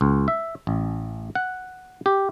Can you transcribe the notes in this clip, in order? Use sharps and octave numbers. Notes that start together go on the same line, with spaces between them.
C#2
E5
A1
F#5
G4